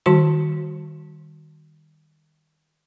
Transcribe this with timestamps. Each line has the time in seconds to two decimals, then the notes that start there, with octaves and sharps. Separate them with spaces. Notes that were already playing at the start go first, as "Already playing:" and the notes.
0.06 D#3 G3 F#4 A5 C6